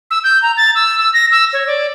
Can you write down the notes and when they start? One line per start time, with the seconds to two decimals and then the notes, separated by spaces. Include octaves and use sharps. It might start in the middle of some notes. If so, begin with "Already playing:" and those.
0.11 E6
0.24 G6
0.42 A#5
0.57 A6
0.75 E6
0.98 E6
1.14 A#6
1.32 E6
1.53 C#5
1.67 D5